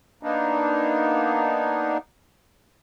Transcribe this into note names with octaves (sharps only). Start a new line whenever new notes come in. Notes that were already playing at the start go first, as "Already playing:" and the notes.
A#3 B3 D4 D#4